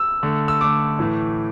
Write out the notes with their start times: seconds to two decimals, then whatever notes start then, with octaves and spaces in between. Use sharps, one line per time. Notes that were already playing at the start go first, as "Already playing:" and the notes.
Already playing: E6
0.23 D3 A3
0.48 E6
0.61 D3 A3 D6
0.99 A2 E3 A3